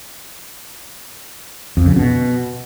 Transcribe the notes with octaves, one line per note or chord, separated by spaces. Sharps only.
F2
C#3
B2